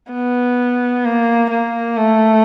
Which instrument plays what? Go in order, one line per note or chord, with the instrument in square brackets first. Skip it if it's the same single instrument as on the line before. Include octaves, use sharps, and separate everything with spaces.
[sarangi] B3
A#3
A#3
A3